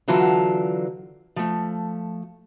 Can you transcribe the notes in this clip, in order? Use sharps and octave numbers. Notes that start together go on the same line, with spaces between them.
D3 E3 F#3 F4 A5
F3 A3